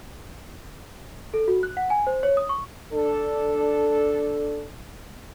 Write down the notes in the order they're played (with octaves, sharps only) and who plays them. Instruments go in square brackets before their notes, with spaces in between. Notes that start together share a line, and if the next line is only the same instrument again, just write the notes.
[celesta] A4
F#4
F#6
F#5
G#5
C5
C#5
D#6
C#6
[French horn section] D4 A4